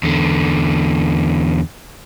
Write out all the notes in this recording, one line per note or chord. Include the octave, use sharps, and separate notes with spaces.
E2 D3